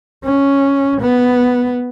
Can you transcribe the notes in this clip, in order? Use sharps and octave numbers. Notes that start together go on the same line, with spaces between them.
C#4
B3